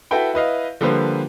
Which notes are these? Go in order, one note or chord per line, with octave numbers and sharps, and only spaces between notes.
E4 F#4 A4 B4 G5 B5
E4 B4 D#5 F5
D3 F3 G3 A#3 B4 C5